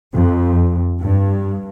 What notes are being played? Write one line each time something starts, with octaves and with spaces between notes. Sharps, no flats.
F2
G2